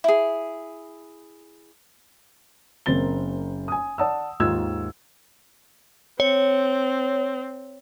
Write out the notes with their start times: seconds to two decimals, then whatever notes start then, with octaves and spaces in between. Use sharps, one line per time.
0.04 E4 G#4
2.86 F#1 A#3 C4 A6 G7
3.68 G#5 D#6
3.98 D5 F#5 A5 D#6 E6
4.40 D#2 G#2 D#3 F4 E6 G#6
6.20 C4 C#5